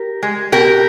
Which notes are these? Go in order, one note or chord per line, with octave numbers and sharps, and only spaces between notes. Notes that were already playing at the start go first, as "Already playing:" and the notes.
Already playing: G4 A#4
G#3
B2 G4 A#4